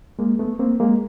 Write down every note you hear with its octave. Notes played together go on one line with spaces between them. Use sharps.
G#3 A#3
A3 B3
A#3 C4
G#3 A#3